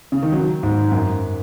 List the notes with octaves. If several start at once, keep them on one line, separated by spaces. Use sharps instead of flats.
C#3
D#3
F#3
G#2
F#2